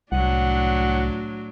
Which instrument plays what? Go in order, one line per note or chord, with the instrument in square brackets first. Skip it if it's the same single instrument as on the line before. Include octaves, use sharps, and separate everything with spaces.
[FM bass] C2 [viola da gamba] A2 F#3 D4 [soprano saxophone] F#5